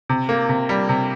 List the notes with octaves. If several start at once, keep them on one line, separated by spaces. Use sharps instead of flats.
C3
A#3
C3
G3
C3